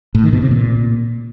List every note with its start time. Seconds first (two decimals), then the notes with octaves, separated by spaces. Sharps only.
0.15 A2
0.24 D#3
0.33 B2
0.42 C3
0.51 A#2